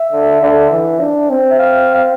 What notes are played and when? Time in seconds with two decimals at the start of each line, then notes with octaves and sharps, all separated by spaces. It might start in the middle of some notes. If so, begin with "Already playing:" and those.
Already playing: E5
0.12 D3
0.42 D3
0.71 E3
1.00 D4
1.30 C4
1.50 E5
1.59 F5
1.95 F5